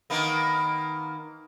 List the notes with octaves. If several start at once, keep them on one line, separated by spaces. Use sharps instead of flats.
D#3 A#3 B3